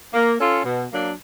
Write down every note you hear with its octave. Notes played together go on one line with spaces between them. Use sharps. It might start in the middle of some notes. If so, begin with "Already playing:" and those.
A#3
C#4 F4 A4
B2
F#3 A#3 D4